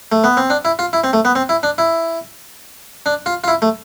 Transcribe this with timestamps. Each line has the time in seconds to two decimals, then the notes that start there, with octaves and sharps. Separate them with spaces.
0.12 A3
0.24 B3
0.37 C4
0.50 D4
0.65 E4
0.79 F4
0.93 E4
1.04 C4
1.13 A3
1.25 B3
1.35 C4
1.49 E4
1.63 D4
1.78 E4
3.06 D4
3.26 F4
3.44 F4
3.48 E4
3.62 A3